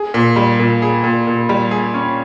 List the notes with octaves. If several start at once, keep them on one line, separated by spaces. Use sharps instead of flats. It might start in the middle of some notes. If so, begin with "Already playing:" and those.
Already playing: G#4
A#2
G3
A#2
G#4
A#2
A#2
G3
G#4
C#4